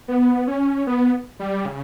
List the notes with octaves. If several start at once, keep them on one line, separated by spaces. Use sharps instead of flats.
B3
C#4
B3
G3
C#3